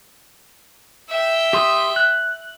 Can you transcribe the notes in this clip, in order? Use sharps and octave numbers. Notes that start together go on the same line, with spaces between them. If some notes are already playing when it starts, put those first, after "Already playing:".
E5 G5
G4 C6 D#6
F#6